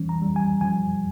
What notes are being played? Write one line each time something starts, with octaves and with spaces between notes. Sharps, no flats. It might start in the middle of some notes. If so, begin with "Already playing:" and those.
Already playing: E3 G3 C#4
A#5
G3
G#5
F3 G#5